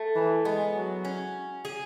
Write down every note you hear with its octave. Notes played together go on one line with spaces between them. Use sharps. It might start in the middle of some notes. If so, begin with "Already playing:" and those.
Already playing: A3
E3
G#3 B3
F#3
C#4
G#4